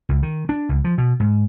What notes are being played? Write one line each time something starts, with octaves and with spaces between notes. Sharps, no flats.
C#2
D#3
D4
C#2
F3
B2
G#2